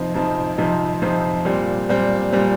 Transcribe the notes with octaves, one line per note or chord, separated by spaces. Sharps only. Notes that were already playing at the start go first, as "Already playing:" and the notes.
Already playing: F2 C3 F3 C4 D#4
F2 C3 F3 C4 D#4
F2 C3 F3 C4 D#4
F2 C3 F3 C4 D#4
A#2 G3 C4
A#2 G3 C4
A#2 G3 C4